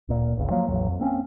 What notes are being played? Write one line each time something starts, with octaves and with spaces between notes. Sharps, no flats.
D1 A#2
G1 C#2
F3 F#3 A#3
A1 E2 C3 F#3
F2
A#3 C4 C#4